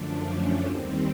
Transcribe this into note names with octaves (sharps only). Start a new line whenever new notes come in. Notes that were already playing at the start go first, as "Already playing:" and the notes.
Already playing: F#2 D3 F3 A3 D4
C#4
D#2 D#3 G3 C4